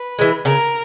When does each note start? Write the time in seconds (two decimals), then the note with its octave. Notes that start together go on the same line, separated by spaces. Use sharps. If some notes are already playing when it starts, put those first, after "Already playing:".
Already playing: B4
0.19 E3 G#3
0.45 C#3 A#4